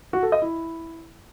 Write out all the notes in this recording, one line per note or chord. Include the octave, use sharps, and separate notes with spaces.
F#4
A4
D#5
E4